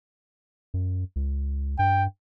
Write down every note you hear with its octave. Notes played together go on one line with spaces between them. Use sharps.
F#2
C#2
G2 G5